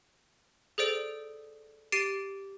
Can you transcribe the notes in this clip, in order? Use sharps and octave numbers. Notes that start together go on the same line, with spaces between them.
G#4 A4 C5 D5 D7
G4 A6 C7 D7 D#7